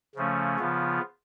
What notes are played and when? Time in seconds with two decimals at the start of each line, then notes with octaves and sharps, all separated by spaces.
0.15 C#3 F3 A3 C#4
0.58 C#3 F3 B3 F4